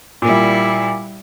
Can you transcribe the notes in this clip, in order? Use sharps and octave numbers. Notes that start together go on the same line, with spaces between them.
A#2 G3 E4